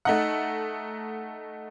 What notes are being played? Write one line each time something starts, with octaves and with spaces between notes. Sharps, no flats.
A3 D#4 F#5